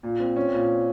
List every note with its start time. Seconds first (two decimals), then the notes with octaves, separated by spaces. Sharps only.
0.03 A#2
0.20 C4
0.36 C#4
0.53 A#2